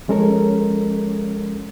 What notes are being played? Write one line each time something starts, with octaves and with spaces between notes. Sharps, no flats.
F3 G#3 C#4 A4 A#4 C#5